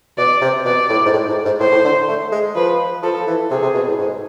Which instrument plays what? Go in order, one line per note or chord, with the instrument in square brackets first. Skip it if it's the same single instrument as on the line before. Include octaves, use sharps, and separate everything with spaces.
[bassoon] B2 [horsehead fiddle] D5
[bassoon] C3
[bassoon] B2 [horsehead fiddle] D5
[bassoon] A2
G#2
A2
G#2
G#2
[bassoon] A2 [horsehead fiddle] C5
[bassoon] A2
D3
A3
G#3
[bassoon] F3 [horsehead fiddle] B4
[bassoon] F3 [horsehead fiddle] A4
[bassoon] E3
[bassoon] C3 [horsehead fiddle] G#4
[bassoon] C3
B2
A2
G#2